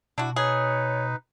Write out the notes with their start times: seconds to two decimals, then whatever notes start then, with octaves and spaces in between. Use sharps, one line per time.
0.18 B2 D4 E4 F#4
0.36 D#4 G#4 B4 C#5